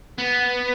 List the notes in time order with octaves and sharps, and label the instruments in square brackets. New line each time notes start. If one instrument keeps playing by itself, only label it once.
[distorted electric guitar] B3